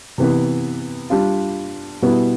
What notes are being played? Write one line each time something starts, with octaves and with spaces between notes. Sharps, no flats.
C3 E3 B3
G3 D4 F4
B2 G3 B3 E4